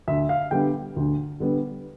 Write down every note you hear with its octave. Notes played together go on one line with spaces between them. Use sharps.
D2 E5
F5
D3 G3 B3 G5
D2
D3 G3 B3